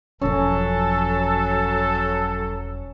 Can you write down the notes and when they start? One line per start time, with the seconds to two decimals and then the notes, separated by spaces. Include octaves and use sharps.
0.21 E1 F3 F#3 C#4 A4